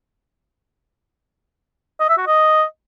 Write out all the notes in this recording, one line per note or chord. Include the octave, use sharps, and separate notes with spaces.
D#5
E5
F#4
D#5